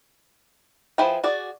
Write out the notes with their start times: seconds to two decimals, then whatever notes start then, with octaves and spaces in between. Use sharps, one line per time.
0.98 F3 E4 G#4 B4 G5
1.24 F#4 G#4 D5